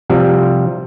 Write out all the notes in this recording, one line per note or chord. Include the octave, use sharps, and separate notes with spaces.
C3 F3 G3